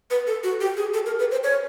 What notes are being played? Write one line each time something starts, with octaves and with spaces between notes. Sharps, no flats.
B4
A4
F#4
G4
G#4
A4
A#4
B4
C5
C#5